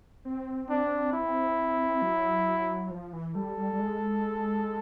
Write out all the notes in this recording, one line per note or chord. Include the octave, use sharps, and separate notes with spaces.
C4
D4
E4
F#3
F3
E3
G3 A4
G3
G3
G#3